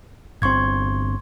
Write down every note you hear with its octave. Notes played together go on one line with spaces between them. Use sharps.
G1 C4 C6 C#6 G#6